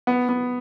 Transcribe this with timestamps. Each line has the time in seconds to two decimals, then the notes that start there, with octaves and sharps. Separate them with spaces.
0.07 B3
0.29 B3